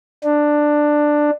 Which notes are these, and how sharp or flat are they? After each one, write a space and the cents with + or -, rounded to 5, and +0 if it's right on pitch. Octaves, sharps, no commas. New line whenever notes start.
D4 +10